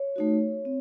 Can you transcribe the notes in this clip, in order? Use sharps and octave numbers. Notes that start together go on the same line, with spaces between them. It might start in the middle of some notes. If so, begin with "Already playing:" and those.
Already playing: C#5
A3 D#4 F#4
C4